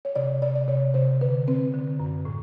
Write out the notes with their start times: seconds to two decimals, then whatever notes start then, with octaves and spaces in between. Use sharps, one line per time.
0.05 C#5
0.16 C3 D5
0.42 C3 D5
0.55 D5
0.68 C3 C#5
0.94 C3 C5
1.21 D3 B4
1.48 C4 B4
1.74 D3
2.00 F#2
2.25 A2